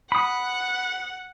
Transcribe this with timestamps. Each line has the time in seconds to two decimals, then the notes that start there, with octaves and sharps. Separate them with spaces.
0.12 F#5 B5 D#6